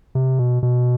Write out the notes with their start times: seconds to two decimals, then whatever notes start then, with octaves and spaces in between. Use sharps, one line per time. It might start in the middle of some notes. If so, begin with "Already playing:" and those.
0.15 C3
0.39 B2
0.63 B2